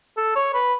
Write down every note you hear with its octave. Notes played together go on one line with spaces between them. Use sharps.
A4
C#5
B4